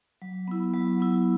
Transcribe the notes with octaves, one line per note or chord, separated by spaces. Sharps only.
F#3
B3 E4
F#3
B3 E4